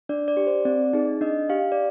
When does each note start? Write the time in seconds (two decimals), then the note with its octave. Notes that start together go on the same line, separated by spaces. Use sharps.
0.09 D4 D5
0.28 D5
0.37 G4
0.47 C5
0.65 C4 D5
0.93 D#4 G#4
1.21 D4 D#5
1.50 G4 F5
1.72 D5